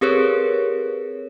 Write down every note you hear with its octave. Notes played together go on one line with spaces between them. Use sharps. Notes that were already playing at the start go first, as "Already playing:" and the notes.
C4 G4 G#4 A#4 B4 C#5